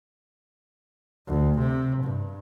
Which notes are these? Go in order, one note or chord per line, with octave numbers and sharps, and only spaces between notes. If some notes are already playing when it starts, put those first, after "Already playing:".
D2
C3
G2